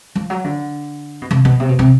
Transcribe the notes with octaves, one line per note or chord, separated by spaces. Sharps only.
F3
F#3
D3
B2
C3
B2
C3
B2
C3